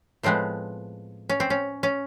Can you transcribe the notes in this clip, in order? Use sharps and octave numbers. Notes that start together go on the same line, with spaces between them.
A2 F3 G#3 B3 C4
C#4
C4
C#4
C#4